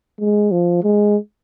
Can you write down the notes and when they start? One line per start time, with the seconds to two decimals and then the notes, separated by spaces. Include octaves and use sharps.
0.20 G#3
0.51 F3
0.83 G#3